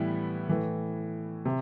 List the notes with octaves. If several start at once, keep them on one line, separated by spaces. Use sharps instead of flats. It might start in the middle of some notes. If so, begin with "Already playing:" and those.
Already playing: A2 E3 G3 B3 E4
A2 E3 A3
C3